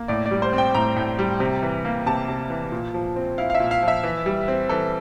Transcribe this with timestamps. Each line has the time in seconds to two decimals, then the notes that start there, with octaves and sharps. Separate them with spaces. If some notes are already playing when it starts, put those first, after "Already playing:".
Already playing: A#3
0.08 A2 D5
0.26 D5
0.31 G3
0.42 C5
0.53 C4 G5
0.74 A2 A#5
0.96 A2
1.19 G3
1.40 C3
1.63 E3
1.85 A#3
2.06 C3 A5
2.28 C3
2.50 E3
2.72 A#2
2.94 F3
3.16 C4
3.38 E4 F5
3.50 F5
3.55 E5
3.60 A#2
3.71 F5
3.83 F3
3.88 E5
4.03 E3
4.26 G3
4.48 C4
4.69 E3 A4